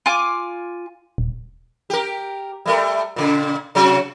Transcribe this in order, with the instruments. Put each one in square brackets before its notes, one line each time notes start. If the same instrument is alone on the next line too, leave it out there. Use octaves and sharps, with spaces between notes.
[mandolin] F4 G#5 D6
[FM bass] D#1
[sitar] G4 A#4
G3 A3 A#4
A#2 C#3
C3 F#3 F#4